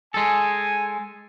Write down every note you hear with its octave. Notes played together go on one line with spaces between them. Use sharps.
G#3 A4 G#5